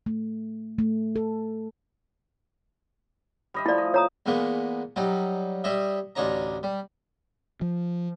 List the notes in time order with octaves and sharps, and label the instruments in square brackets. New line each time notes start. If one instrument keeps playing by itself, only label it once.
[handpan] A3
A3
A4
[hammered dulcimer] G3 D#5 E5
[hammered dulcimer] F3 A3 [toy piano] E4 D5
[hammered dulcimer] D#5
[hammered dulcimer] A3 [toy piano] C#5 A#5 D#6
[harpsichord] E2 G#3 A#3 B3
F#3 G3 D#4
G3 C#5 D#5 E5
A1 D2 D4 D#4 C#5 A#5
G3
[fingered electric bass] F3